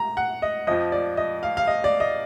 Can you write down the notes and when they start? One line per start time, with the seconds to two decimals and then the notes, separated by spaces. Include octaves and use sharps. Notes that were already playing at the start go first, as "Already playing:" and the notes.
Already playing: A#5
0.17 F#5
0.42 D#5
0.67 F2 F3 D#5
0.92 D5
1.17 D#5
1.43 F5
1.57 F5
1.67 D#5
1.84 D5
2.00 D#5